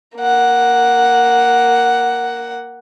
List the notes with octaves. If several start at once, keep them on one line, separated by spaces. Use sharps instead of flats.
A#3 F#5